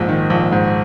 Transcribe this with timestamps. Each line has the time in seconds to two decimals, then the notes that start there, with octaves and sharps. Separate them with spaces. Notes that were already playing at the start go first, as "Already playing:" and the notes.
Already playing: A#1 G#2
0.08 D#3
0.30 A#1
0.52 G#2